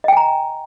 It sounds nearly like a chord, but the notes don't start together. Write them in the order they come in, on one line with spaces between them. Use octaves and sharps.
D#5 G5 G#5 A#5